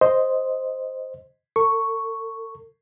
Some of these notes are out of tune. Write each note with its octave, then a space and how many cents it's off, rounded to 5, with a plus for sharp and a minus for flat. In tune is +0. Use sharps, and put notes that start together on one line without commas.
C5 +0 D#5 +0
A4 +45 C#6 +0